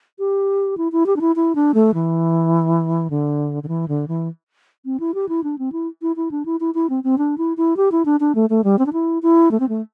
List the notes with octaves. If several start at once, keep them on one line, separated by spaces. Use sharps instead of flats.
G4
E4
E4
G4
D4
E4
E4
D4
A3
E3
D3
D3
E3
D3
E3
C4
E4
G4
E4
D4
C4
E4
E4
E4
D4
E4
E4
E4
C4
C4
D4
E4
E4
G4
E4
D4
D4
A3
A3
G3
C4
D4
E4
E4
A3
C4
A3